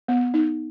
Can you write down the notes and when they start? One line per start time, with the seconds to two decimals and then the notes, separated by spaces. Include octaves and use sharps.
0.08 B3
0.34 D#4